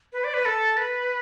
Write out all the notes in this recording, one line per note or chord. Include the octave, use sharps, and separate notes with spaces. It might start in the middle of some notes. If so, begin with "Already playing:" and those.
B4
D5
B4
A4
B4